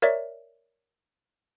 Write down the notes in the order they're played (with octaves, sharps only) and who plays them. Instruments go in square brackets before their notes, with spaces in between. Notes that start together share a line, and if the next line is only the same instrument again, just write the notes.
[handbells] A#4 C#5 D5 E5